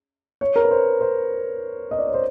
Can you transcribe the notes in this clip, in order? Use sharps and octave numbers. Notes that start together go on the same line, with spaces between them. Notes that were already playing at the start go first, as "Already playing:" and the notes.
C#5
A#4
B4
C5
C5
D#5
D5
C#5
C5